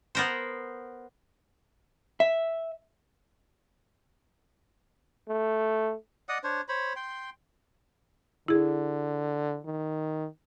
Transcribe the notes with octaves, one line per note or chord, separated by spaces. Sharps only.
B3 A#4 C5
E5
A3
D5 D#5 F#5 D#6
D4 C5 C#5
C5 C#5 B5
G5 C6
D3 E4 G#4
D#3